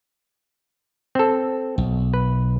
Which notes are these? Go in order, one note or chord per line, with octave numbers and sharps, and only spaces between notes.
C4 A4
B1
B4